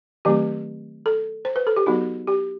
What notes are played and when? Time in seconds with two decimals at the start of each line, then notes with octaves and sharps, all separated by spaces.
0.25 D#3 F#3 A3 C4 G4
1.06 A4
1.45 C5
1.56 B4
1.67 A4
1.76 G4
1.86 F#3 B3 D#4 F#4
2.27 G4